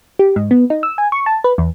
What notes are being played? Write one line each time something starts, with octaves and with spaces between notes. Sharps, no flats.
G4
G#2
B3
D#4
E6
G#5
C#6
A5
B4
E2